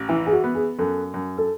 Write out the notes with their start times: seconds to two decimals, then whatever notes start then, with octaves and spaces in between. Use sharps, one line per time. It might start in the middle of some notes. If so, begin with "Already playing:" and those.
Already playing: A1
0.09 E3 E4
0.27 G#4
0.32 F#4
0.44 B3
0.55 G#4
0.78 F#2 A4
1.14 F#2
1.38 A4